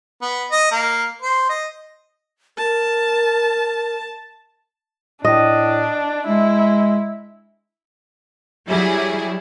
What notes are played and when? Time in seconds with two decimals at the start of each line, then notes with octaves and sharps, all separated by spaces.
0.22 B3
0.51 D#5
0.71 A#3
1.22 C5
1.49 D#5
2.58 A#4 A5
5.25 A2 D4 D#5
6.27 G#3 E4
8.68 F#3 G3 E4 G#4